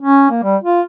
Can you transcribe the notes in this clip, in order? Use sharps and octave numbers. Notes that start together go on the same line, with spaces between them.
C#4
A#3
G3
F4